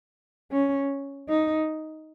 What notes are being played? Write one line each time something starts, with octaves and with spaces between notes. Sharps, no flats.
C#4
D#4